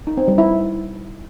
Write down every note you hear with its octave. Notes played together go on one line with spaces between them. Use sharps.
D#4
C4
G3
E4